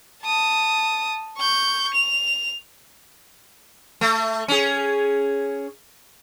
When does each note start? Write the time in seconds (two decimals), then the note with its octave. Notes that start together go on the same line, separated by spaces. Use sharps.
0.24 A5 D#6
1.38 C#6 G6
1.94 F7
4.01 A3
4.48 C#4 G#4